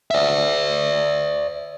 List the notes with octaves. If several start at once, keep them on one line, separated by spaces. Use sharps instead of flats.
D5 E5